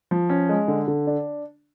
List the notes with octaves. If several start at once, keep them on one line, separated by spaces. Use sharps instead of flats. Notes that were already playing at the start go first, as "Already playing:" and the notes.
F3
C#4
G#3
D3
D3
D4